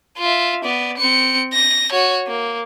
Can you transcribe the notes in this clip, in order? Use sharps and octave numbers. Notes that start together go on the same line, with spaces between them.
F4 E5
B3 D5
C4 C#7
A#6
F#4 C#5
A#3